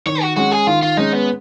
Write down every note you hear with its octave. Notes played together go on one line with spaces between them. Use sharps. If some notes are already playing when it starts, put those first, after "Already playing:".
D#3 C#5
F#4
G#3 C#4 F#4
G#4
D#3 F4
F4
G#3 C#4 D#4
B3